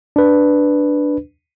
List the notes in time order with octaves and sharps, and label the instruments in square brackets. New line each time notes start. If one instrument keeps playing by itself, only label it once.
[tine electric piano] D4 B4